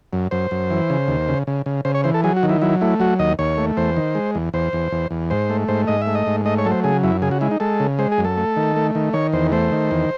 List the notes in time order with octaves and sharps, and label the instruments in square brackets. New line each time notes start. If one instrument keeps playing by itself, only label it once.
[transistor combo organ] F#2
F#2 C5
F#2
E3
C#3
D#2
C#3
C#3
C#3
C#3 C5
C#5
E3 C5
A4
F#3 G#4
F#4
D#3
E4
F#3 E4
A3 E4
F#3 F#4
D#2 D#5
D#2 C#5
A3
E2 C5
D#3
G#3
E2
E2 C5
E2
E2
E2
G#2 C5
A3
G#2 C5
G#2 D#5
E5
A3
D#5
G#2
A3 D#5
C#5
F#3 A4
C5
C#3 G#4
F#2 E4
C#3 G#4
F#4
G#3 E4
D#4
G#3 A4
C#3
G#3 C5
G#4
F#2
A4
A3
D#3
A3
D#3
D#3 C#5
E2 C5
A3 C5
D#3
E2